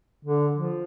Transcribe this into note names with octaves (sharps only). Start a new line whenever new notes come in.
D3
F3